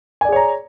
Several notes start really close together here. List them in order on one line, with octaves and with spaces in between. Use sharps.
G#5 D5 G#4 C#5 A#5